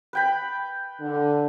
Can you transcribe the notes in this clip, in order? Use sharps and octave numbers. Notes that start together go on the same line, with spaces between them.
B4 G5 B5
D3